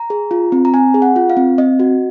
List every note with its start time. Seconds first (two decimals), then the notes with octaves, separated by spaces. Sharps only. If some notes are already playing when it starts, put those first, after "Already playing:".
Already playing: A#5
0.10 G#4
0.31 F4
0.52 C4
0.65 A#5
0.74 C4 G#5
0.94 G#4
1.02 F#5
1.16 F4
1.30 F5
1.37 C4
1.58 C4 D#5
1.80 F#4